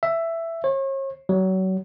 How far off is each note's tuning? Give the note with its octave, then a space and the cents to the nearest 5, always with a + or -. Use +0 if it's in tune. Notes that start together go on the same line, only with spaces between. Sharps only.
E5 +10
C#5 -40
F#3 +30